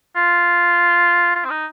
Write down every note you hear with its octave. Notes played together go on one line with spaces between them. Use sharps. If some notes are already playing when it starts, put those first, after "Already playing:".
F4
F4
C4
D#4